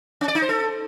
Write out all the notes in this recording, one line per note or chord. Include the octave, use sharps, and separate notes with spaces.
C#4
D5
D#4
C5
A4